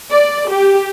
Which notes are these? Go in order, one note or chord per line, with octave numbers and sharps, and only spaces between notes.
D5
G4